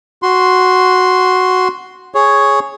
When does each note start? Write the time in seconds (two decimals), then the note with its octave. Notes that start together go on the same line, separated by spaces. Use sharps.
0.23 F#4 C6
2.15 G#4 C#5